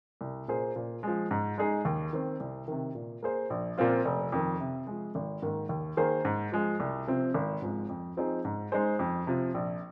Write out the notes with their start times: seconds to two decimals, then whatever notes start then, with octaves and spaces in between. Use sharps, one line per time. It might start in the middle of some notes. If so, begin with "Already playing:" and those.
0.21 C2
0.48 A#2 A#3 G#4 C5
0.76 A#2
1.03 F3 G#3
1.31 G#2
1.58 G#3 D#4 G#4
1.85 D#2
2.13 D#3 C4
2.40 C2
2.68 C3 D#3
2.95 A#2
3.22 A#3 G#4 C5
3.50 A#1
3.78 A#2 F3 C4 F4
4.05 F1
4.32 F2 D#3
4.60 C3
4.87 F3 G#3
5.15 G#1
5.42 G#2 D#3 A#3
5.69 D#2
5.97 D#3 A#3 G#4 C5
6.25 G#2
6.52 F3 G#3
6.80 C2
7.07 C3 F3 C4
7.34 G#1
7.62 G#2 F3 G#3 C4
7.89 F2
8.17 F3 C4 D#4 G#4
8.45 G#2
8.72 G#3 D#4 G#4 C5
8.99 F2
9.27 C3 F3
9.54 A#1